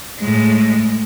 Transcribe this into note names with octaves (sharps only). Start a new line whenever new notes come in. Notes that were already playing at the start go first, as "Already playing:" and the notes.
A2 G#3